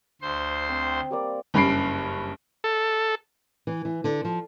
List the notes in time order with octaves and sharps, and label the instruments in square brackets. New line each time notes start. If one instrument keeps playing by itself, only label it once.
[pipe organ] D2 C5 C6
[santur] C4
G3 A#3 D5
[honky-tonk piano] F#1 G2 C#4 B5 C7 D7
[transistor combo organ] A4
[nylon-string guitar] E3
E3
D3
F3